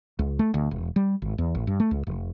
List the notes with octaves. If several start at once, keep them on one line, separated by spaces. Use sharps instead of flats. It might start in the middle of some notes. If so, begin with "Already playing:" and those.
C#2
A3
D2
E1
G3
G#1
E2
A1
G2
A3
C#2
F1